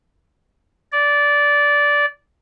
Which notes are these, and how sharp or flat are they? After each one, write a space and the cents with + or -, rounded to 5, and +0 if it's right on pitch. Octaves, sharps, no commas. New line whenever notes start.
D5 -15